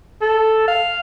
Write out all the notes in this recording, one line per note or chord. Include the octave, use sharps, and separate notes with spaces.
A4
F5